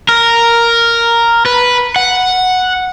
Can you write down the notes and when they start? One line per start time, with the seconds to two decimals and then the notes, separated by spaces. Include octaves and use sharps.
0.09 A#4
1.46 B4
1.96 F#5